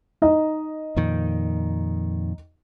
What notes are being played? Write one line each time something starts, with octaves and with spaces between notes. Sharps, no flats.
D#4 D#5
F2 A#2 D#3